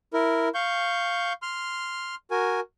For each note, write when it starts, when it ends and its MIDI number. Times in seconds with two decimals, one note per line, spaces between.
0.13 0.49 64
0.13 0.49 70
0.54 1.33 77
0.54 1.33 85
0.54 1.33 91
1.42 2.15 84
1.42 2.15 89
2.31 2.60 66
2.31 2.60 70
2.31 2.60 80